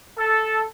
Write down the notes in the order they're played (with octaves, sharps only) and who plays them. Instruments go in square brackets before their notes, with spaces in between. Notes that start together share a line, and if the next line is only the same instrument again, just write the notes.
[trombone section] A4